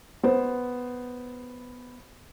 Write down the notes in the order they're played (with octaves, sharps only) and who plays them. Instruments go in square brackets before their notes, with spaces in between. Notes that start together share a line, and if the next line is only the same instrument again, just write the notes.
[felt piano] B3 C5